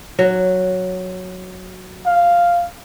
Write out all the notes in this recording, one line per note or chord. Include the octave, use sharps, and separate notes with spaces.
F#3
F5